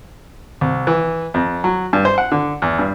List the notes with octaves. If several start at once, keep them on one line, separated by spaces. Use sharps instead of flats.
C2
E3
F2
F#3
G2
C5
F#5
D3
E2
G2